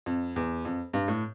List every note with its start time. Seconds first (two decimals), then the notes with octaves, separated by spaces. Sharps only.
0.06 F2
0.36 E2
0.65 F2
0.94 G2
1.08 A2